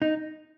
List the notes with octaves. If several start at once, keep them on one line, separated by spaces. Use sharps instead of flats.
D#4